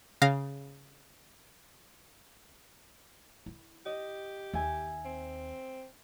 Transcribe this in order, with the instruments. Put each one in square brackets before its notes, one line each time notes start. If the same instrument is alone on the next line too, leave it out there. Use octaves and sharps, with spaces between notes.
[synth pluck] C#3 F5 A#6
[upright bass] E4
[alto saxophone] G4 [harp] D#5
[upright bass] D#2 [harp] E5 G#5
[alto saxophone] C4